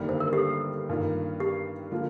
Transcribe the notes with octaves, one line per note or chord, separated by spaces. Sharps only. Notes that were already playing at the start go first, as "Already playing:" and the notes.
Already playing: G1 G2 D#3 G3 A#3
C5
A#4
G4
A4
G2 D#3 A#3 F4
G4
D3 F3 A#3 F4